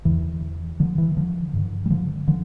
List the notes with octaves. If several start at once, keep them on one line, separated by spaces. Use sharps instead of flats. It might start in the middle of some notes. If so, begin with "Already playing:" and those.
E2 D3 E3
D3 F3
E3
D3 F3
G2 D3
G3
D3 F3
D3 F3